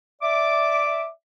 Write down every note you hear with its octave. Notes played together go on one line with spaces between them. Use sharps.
D5 E5 D6